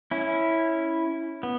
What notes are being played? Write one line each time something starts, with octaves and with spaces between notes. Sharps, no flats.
C#4 E4
B3